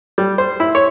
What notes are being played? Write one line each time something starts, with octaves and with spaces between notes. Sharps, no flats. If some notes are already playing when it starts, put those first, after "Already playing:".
G3
C5
E4
C#5